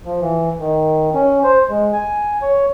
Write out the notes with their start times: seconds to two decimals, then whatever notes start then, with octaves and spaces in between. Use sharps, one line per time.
0.05 F3
0.20 E3
0.60 D#3
1.14 C#4
1.44 C5
1.69 G#3
1.93 G#5
2.42 C#5